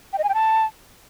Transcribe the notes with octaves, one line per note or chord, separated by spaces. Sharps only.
G5
D#5
G#5
G5
A5